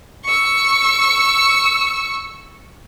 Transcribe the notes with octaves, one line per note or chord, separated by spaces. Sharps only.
C#6 E6